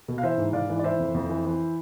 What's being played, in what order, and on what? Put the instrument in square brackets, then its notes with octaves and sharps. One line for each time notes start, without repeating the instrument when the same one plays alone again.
[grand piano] B2
F5
E3 C5 E5
G#2
G#2 D5 F5
E3
D5
E3 C5 E5
F2
F2
E3
E3